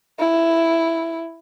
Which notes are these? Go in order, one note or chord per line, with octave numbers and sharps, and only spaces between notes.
E4